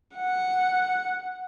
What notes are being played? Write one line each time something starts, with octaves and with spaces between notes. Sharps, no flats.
F#5